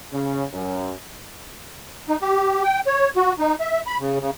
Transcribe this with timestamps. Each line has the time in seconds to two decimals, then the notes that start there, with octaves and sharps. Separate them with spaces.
0.12 C#3
0.53 F#2
2.09 D#4
2.22 G4
2.63 G5
2.87 C#5
3.16 F#4
3.39 D#4
3.60 E5
3.87 B5
3.99 C#3
4.21 C#3